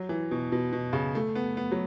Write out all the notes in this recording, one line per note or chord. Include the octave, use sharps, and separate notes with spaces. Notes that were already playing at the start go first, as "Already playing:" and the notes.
Already playing: F#3
E3
B2
B2
B2
C#3
A3
B3
B3
F#3